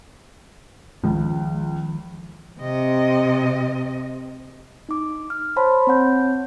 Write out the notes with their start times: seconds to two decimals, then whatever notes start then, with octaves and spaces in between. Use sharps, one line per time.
1.04 C#2 D#3 F3
2.61 C3 D#5
4.89 D#4 D6
5.30 F6
5.56 C5 C#5 A5 B5 C6
5.87 C4 C#5 F#5 G6